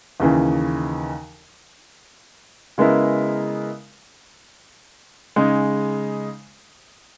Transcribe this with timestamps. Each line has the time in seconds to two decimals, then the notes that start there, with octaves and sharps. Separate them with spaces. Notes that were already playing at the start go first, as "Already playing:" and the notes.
0.20 D#2 C#3 E3
2.78 C#3 G#3 B3 E4 A#4
5.36 C#3 G#3 D#4